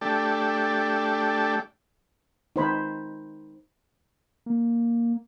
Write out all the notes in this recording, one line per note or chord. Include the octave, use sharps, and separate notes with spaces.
A3 D4 G4
D#4 C5 B5
A#3